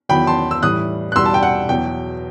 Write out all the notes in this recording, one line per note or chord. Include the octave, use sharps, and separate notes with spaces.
E2 D#3 F#3 G5 B5
A5 C6
E6
A2 E3 G3 D#6 F#6
F#6
E2 B2 G3 C6 E6
A5
G5
F#5
E2 B2 F#3 G5